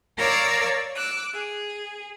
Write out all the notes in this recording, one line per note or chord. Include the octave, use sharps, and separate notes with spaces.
A#4 C#5 D5 F5 D6 E6
D6 E6 F#6
G#4